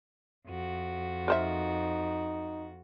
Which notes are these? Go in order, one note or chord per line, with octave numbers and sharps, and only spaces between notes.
F2 F#4
D#4 A#4 C5 E5